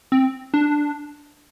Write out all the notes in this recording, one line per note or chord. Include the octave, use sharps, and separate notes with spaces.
C4
D4